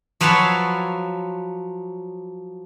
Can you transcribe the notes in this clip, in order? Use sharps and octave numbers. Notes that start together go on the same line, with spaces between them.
F3 F#3 B4 C#5 F5 A5